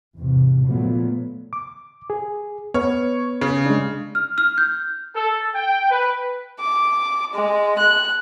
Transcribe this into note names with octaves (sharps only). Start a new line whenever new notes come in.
E2 G#2 C3
A#2 D3 F3 F#3 A3 B3
D6
G#4
B3 B4 C#5 F6
C#3
G#3 D4
F6
F6
G6
A4
G5
B4
D6
G#3
F#6